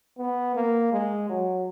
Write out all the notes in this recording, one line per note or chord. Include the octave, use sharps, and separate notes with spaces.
B3
A#3
G#3
F#3